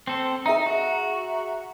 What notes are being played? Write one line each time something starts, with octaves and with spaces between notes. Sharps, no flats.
C4 A4
D#4 G#4 E5 A#5
F#4